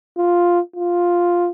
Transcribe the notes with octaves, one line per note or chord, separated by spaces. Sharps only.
F4
F4